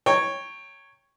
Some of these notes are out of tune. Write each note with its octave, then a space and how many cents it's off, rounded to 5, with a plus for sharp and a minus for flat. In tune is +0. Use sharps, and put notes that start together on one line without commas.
C#5 -5 G5 +15 A#5 -30